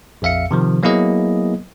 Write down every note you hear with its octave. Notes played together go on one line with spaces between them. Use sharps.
A#1 F2 E5 F5 C#7
C3 D#3 F3
F#3 A#3 B3 E4 G#4 D#5